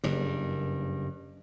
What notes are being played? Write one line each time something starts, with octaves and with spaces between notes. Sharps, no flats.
F#1 G2